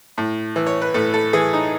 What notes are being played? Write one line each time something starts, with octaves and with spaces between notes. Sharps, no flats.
A2
E3
C#5
B4
A2 A4
A4
E3 G#4
D#4